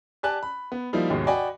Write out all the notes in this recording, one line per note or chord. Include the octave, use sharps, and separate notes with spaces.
G4 D5 G#5 A5 F#6
B5
B3
F3 G3 A#3 D#4 E4
D#2 G#2 B2 D#3
F#4 D5 D#5 G5 G#5 B5